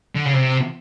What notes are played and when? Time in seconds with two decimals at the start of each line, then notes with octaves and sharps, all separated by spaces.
0.15 D3
0.25 C#3
0.33 C3